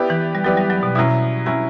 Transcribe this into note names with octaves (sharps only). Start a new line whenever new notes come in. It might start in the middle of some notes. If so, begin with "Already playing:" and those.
Already playing: B3 E4 G4 B4 D5
E3
G3
F#3 B3 E4 G4 B4 D5
G3
F#3
B2
B2 F#3 C#4 E4
F#3 C#4 E4